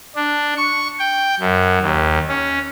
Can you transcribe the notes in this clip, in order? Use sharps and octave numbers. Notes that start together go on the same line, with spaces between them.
D4
C#6
G5
F#2
D#2
C#4